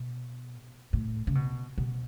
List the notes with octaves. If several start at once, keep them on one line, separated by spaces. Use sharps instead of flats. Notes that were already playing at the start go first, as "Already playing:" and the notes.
Already playing: B2
A2
C#3
B2
B2